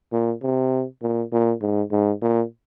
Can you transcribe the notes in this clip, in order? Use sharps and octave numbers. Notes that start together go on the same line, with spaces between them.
A#2
C3
A#2
A#2
G#2
G#2
A#2